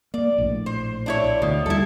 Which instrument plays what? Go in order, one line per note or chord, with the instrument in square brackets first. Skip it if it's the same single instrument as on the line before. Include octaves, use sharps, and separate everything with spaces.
[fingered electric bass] A#3 [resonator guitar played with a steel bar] D5
[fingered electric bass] A#1 A2
[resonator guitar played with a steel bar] C5
D4 E4 C#5
[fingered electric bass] D2 [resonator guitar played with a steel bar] B2
[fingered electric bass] D#2 G3 [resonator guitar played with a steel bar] E4 A4